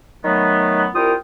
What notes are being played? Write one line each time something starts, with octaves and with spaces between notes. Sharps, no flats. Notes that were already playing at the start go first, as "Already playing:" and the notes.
D#3 F#3 A3 B3
C2 F4 A#4 G5 D#6